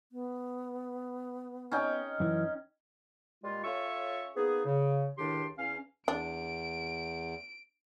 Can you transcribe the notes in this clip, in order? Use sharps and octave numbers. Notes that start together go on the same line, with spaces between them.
B3
C#4 D#4 G5
F#2 E3
A#2 G3 G#3 F4
C#4 F4 A4 C#5 E5 C#6
A#3 B3 D#4 G#4
C#3
C#2 A2 D#3 D4 G4 C6
E2 C#4 F5
E2 D4 D7